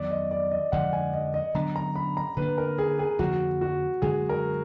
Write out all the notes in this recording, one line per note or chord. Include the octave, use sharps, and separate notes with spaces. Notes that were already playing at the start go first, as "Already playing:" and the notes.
Already playing: F2 D#3 F#3 B3 D5
D#5
D5
D#5
F2 D3 F3 G#3 F#5
G#5
D#5
D#5
D3 F#3 B3 D4 A#5
A#5
B5
A#5
D3 F#3 A#3 D4 B4
A#4
G#4
G#4
F2 D3 F3 A#3 F#4
F#4
F#2 D3 G#3 G#4
A#4